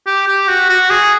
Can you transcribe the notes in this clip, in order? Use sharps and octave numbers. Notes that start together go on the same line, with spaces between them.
G4
G4
F#4
F#4
G#4